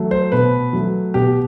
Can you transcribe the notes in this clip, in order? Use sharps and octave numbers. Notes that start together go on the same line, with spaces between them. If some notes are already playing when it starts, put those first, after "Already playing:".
Already playing: F#3 A3
C5
B2 B4
F#3 A3
B2 G4